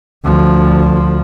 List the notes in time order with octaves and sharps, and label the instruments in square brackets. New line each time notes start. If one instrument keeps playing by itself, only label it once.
[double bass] D2 F3